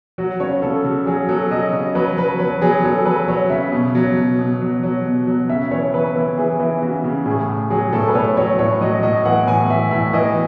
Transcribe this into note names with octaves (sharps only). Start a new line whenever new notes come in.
F#3 F#4
C#3 C#5
C#3 A4
C#3 F#4
F#3 G#4
F#3 A4
F#3 D#5
C#3 D#5
F#3 B4
F#3 B4
F#3 B4
F#3 G#4
F#3 A4
F#3 B4
F#3 C#5
C#3 E5
B2
F#3
B2
B2
F#3
F#3
B2
F#3
C#3 E5
E3 C#5
E3 B4
E3
E3 G#4
E3
C#3 F#4
C#3
A2 G#4
A2
F#3 G#4
A2 A4
B4
A2 C#5
F#3 C#5
A2 C#5
F#3 D#5
A2 D#5
E3 F#5
A2 G#5
E3 E5
A2 E5
E3 D#5